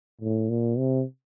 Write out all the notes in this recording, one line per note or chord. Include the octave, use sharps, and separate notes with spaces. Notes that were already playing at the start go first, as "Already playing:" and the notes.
A2
A#2
C3